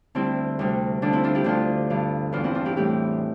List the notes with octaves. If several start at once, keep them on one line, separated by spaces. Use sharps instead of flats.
D2 D3 G3 C4 E4
D2 C3 G3
D2 D3 F3 D4
C4 E4
D4 F4
E4 G4
D2 D3 F3 D4 F4
G2 D3 F3
E2 B2 G3 D4 F4
C4 E4
D4 F4
E4 G4
A2 E3 G3 E4 G4